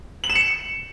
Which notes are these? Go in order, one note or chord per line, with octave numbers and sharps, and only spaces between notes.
F#7
E7
C#7